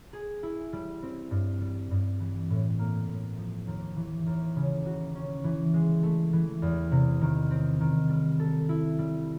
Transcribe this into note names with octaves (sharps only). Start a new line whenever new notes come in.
G#4
E4
G3
C4
G2
G3
G2
E3
A2
A#3
A2
F3
D#2
E3
D#2
C#3
F#4
C#4
E3
G#3
A3
E3
E2
C3
D#3
C4
D#3
G3
A4
E4
G3